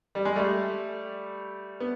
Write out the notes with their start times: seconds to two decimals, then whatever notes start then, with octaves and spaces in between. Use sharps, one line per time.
0.15 G3
0.25 G#3
0.36 G3 A3
1.80 B3